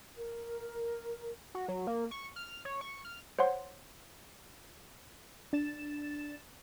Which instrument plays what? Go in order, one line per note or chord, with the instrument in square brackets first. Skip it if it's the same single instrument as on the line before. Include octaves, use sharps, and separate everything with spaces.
[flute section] A#4
[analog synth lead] F#4
F#3
A#3
C#6
F6
C#5
C#6
F6
[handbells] C5 C#5 F#5 C6
[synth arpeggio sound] D4 A6 E7